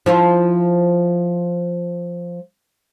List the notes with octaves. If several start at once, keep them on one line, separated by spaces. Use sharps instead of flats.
F3 E4 F4